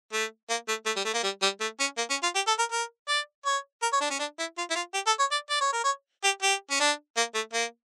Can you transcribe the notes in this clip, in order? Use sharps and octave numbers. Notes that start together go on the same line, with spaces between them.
A3
A#3
A3
A3
G3
A3
A#3
G3
G3
A3
C#4
A#3
C#4
F4
G4
A4
A#4
A#4
D5
C#5
A#4
C#5
D4
C#4
D4
E4
F4
E4
F4
G4
A4
C#5
D5
D5
C#5
A#4
C#5
G4
G4
C#4
D4
A#3
A3
A#3